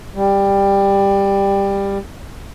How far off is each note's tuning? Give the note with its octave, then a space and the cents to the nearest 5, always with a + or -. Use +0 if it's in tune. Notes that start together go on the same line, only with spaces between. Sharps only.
G3 +15